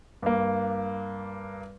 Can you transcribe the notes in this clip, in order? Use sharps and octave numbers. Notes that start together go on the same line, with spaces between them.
G2 A#3